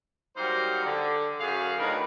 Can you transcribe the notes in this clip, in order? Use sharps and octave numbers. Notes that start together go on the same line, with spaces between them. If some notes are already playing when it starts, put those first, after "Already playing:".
F#3 G3 A#3 D#4 A#4 C5
D3
F#2 G#4 F5
D2 A2 D3 D#3 D#4 B4